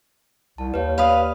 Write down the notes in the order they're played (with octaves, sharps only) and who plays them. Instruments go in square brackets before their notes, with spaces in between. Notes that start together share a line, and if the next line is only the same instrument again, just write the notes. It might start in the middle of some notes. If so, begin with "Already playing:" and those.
[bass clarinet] C2 [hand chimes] A5
[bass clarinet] D#2 [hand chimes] B4 C#5
[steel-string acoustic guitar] B4 F5 [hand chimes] D5 B5 D#6
[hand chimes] D#6